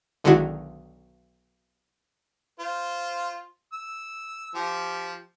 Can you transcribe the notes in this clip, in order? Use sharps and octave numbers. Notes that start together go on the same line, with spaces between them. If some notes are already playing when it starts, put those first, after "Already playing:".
B1 D3 D#3 G#3 E4 F#4
F4 C5
E6
F3 G4